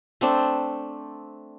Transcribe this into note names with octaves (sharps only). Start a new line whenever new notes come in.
A3 C4 D4